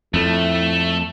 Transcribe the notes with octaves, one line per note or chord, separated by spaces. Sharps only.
F2 A2 A3